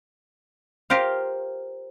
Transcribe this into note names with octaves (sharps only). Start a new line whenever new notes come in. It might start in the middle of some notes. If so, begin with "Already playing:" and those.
F4 G4 A#4 C5 F5